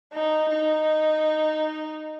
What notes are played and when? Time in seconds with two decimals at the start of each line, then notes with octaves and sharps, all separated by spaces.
0.13 D#4
0.51 D#4